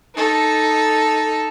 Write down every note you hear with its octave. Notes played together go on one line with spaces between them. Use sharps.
D#4 A4